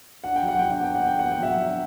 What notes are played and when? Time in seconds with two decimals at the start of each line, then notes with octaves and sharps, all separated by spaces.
0.24 D4 F#5
0.36 G5
0.43 F#3
0.48 F#5
0.59 D4 G5
0.72 F#5
0.81 B3 G5
0.95 F#5
1.01 B3
1.07 G5
1.19 B3 F#5
1.32 G5
1.39 F#3 E5 F#5
1.59 D4